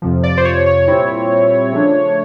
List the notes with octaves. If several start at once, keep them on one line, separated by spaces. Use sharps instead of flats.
F2 C3 F3
D5
C5
C#5
C#5
A#2 G3 C4 E4
C#3 F3 A3 D4